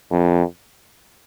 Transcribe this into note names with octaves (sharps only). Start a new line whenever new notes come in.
F2